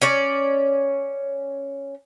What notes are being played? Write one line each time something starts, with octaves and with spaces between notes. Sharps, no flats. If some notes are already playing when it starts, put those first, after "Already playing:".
C#4 C#5 D5